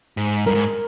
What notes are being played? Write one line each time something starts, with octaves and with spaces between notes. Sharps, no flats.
G#2
G2 A#4
G#2